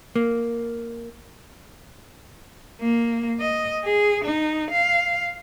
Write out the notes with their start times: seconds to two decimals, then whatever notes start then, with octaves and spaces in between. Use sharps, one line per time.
0.16 A#3
2.81 A#3
3.40 D#5
3.85 G#4
4.24 D#4
4.71 F5